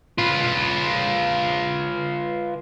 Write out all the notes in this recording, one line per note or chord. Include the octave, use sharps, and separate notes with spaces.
F4 B4